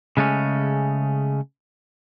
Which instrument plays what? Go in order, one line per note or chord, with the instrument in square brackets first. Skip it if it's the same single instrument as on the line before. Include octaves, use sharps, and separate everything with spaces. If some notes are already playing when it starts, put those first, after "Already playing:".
[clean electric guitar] C#3 G#3 A3 C#4